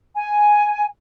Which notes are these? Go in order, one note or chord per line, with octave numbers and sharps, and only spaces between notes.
G#5